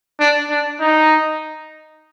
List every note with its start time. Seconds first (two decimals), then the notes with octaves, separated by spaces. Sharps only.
0.20 D4
0.50 D4
0.80 D#4